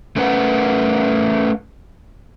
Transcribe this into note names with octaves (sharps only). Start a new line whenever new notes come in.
A3 C#4 A#4 B4 F#5